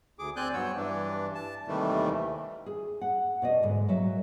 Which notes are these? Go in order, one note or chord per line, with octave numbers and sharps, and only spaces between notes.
D2 G#4 D6
C4 D5 G#5 F#6 G6
G2 F#3 B3 C#5 E6
G2 E3 D4
A5
D#2 C3 D#3 E3 G3 A3
G#4
F#5
B2 D5 D#5
D2 G#2
A#2 F#3 E5